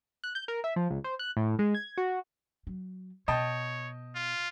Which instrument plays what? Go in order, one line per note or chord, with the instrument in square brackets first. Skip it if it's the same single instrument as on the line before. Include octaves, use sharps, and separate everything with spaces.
[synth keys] F#6
G6
A#4
E5
F3
C#2
C5
F#6
A2
G#3
G#6
F#4
[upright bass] F#3
[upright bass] B2 [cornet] C#5 [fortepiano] D#5 G5 A5
[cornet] F4